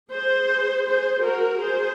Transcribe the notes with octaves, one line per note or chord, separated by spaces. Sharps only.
G#4 C5
G#4 C5
F#4 A#4
G#4 C5